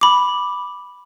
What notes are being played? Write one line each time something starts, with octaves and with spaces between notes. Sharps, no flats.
B5 D6